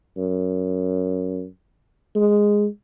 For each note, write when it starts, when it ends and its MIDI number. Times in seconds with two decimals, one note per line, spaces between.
0.17 1.45 42
2.15 2.67 56